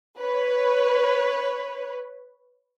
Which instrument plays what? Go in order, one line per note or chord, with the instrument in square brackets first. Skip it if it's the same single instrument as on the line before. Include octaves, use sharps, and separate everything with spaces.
[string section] B4 C#5